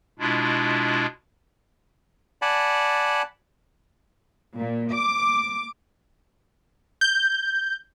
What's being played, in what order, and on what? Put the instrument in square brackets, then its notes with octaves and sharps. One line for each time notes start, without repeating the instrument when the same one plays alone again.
[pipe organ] B2 G#3 D4 E4 F4
[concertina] D5 F#5 G#5 A5 B5
[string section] A#2
D6
[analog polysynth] G6